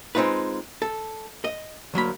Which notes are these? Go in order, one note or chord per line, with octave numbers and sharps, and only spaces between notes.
G#3 C4 D#4 F4 B4
A4
D#5
D2 F#3 A#3 B5